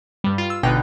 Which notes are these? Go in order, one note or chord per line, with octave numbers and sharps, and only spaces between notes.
G2 G3
F4
E6
G1 B2 D3 D#4 G5 F#6